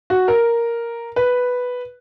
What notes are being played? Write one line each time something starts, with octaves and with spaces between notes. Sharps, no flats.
F#4
A#4
B4